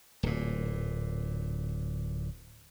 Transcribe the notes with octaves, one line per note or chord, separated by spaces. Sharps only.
D1 A#2